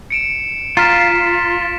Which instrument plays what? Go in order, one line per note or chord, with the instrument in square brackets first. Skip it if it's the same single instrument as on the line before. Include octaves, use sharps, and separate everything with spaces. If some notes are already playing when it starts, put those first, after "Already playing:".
[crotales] C#7 D7 E7
[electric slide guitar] F4 [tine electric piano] A#5 F6 [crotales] A6 B6 E7